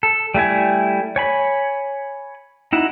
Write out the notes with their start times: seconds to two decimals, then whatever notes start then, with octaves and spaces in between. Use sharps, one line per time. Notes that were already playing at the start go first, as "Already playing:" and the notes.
0.03 A4
0.34 G3 A3 E4 G#5
1.16 C#5 G#5 B5
2.73 D#4 E4 F#4